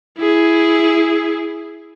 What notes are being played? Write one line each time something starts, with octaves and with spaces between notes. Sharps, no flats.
E4 G#4